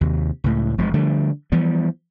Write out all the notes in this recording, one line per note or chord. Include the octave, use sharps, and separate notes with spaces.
D#2 C3
C#2 A2
E1 F3 G#3
D3 F3 G3 A3
E3 F3 G3 B3